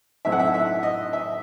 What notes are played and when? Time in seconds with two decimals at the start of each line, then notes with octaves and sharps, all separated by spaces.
0.25 A2 F#3 C4 D#4 E5
0.32 F#5
0.39 E5
0.54 E5
0.83 D#5
1.13 E5